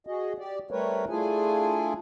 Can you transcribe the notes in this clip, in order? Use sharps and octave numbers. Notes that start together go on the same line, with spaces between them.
F#4 G#4 D#5
G4 D5
G3 A3 C4 A#4 B4 C#5
A3 D4 E4 F4 G#4 G#5